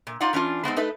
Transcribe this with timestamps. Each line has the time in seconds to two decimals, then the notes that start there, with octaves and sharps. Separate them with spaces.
0.07 A#2
0.20 D#4 F4 D5 F5 F#5
0.33 E3 C#4 D4 F4
0.64 G#3 B3 C4 D#4
0.76 A3 D#4 B4